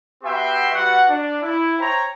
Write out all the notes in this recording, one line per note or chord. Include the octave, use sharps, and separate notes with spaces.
B3 F#4 G4 E5 G5 C6
G3 F#4 B4 F#5
D4
E4
C5 C#5 G5 A#5